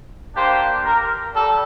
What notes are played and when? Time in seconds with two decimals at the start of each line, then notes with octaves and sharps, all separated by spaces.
0.35 A#3 D4 G4 C5
0.85 A#4
1.34 G3 A4